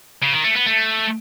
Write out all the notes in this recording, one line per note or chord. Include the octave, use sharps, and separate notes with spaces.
C#3
D#3
A3
B3
A3